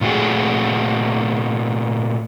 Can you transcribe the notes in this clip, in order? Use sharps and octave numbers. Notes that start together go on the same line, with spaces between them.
A#2 A3 F#4 G#4